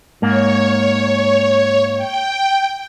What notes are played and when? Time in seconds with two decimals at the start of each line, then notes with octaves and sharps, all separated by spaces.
0.22 G#2 A#3 C#5
1.96 G5